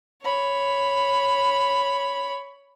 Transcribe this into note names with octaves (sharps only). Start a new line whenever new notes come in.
C#5 B5